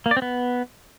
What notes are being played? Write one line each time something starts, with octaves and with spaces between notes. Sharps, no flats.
A#3
D5
C4
B3